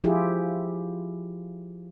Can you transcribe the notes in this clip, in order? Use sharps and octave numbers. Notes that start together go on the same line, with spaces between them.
F3 E4 F4 G4 G#4